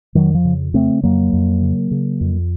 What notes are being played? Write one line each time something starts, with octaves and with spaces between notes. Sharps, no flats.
F2 D#3 F#3
F3
C#3
C#3 A3 C4
F2 F#3 A#3
F2
C#3
C#3
F2